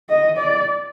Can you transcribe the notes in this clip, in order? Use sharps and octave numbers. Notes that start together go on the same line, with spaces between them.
D#5
D5